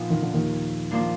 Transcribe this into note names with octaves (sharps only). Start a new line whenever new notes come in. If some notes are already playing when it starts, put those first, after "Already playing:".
Already playing: A#2 F3 B3 D#4
D#3
D3
D#2 D#3
F3 A#3 D4